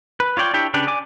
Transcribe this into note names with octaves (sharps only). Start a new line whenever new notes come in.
B4
F4 C#5 D5 G5
D4 E4 G4 C#5 G5
C#3 D4 G4 B4
D5 G#5 D6